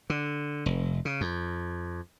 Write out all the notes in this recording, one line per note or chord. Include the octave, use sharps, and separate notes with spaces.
D3
F1
C#3
F2